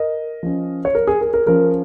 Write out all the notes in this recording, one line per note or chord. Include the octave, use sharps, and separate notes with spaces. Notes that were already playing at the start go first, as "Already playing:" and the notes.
Already playing: A#4 D#5
F3 C#4
C#5
A#4
G#4
A#4
A#4
F3 C#4 A#4